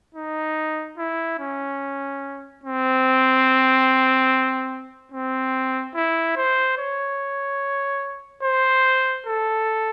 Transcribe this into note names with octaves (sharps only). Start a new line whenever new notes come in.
D#4
E4
C#4
C4
C4
E4
C5
C#5
C5
A4